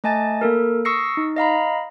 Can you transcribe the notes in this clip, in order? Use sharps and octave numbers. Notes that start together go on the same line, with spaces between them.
A3 D#5 G#5 A5 A6
A#3 A4 A#4
C#6 D#6 E6 A#6 C7 C#7
D#4
D#5 F5 A#5 B5